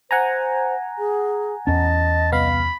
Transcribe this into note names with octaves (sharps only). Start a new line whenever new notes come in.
C5 F#5 G#5 A#5
G#4
E2 C#4 D#5 A5
C2 B3 F5 B5